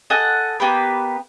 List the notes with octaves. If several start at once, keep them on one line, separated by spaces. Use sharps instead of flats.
A4 D#5 F#5 G#5
A#3 B3 G4 B4